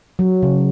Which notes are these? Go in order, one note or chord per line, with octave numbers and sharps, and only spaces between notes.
F#3
C#3